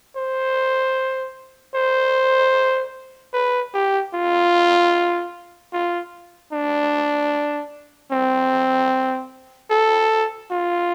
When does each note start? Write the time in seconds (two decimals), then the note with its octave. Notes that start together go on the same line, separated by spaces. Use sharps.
0.16 C5
1.75 C5
3.34 B4
3.74 G4
4.14 F4
5.73 F4
6.53 D4
8.12 C4
9.71 A4
10.50 F4